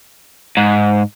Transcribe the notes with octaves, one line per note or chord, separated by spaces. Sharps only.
G#2